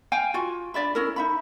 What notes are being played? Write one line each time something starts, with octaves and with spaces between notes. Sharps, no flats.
F5 G5 G#5
F4 F#4 G#5
D4 D5 E5 B5
C#4 E4 A#4
D#4 E5 B5